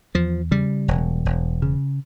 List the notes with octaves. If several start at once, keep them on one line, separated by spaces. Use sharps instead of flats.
E2 F3
C#3 G3
E1
E1
C#3